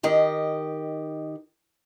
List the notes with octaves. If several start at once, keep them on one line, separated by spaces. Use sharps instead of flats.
D#3 G4 D#5